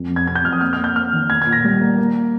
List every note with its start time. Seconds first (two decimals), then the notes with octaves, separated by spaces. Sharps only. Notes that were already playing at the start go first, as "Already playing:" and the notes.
Already playing: F2
0.10 F2
0.16 G#6
0.27 C3 G#6
0.35 G6
0.44 F2 F6
0.52 D#6
0.61 A#3 F6
0.73 F6
0.78 A#3
0.84 G6
0.96 A#3 F6
1.13 D#3
1.30 A#3 G#6
1.42 A#2 G#6
1.52 A#6
1.64 G3
1.81 A#3
1.98 A#3